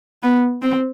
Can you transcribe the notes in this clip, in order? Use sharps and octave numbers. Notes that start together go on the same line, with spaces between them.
B3
C4